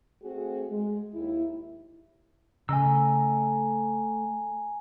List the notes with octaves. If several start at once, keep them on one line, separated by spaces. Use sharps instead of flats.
A3 C4 F#4 G#4
G#3
D#2 E4
C#3 A3 D#5 G#5 A#5 E6